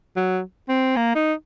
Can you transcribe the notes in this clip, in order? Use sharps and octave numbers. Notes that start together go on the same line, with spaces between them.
F#3
C4
A#3
D#4